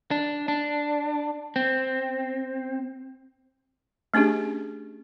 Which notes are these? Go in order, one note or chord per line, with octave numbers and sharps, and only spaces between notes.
D4
D4
C4
A3 C#4 D4 G4 G#4